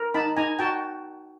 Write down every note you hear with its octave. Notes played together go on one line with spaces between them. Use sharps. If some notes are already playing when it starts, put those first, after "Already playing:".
Already playing: A#4
D#4 A5 B5
D#4 G#5 A#5
F#4 G5 A5